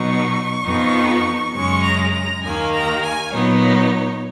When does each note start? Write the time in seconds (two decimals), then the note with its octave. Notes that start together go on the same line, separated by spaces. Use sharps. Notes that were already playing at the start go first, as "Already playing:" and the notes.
Already playing: B2 F#3 B3 D#4 C#6
0.63 F2 F3 B3 D#4
1.53 F#2 C#3 G#3 C#4 C#6
1.83 A#5
2.13 A#5
2.43 D#2 D#3 A#3 G#5
2.72 A#5
3.03 G#5
3.33 A#2 F#3 B3 D#4 C#5